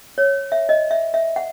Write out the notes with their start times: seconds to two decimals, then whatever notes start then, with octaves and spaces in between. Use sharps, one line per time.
0.18 C#5
0.52 E5
0.69 D#5
0.91 E5
1.14 E5
1.36 F#5